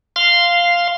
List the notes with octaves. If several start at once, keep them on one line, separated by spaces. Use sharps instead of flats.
F5 C6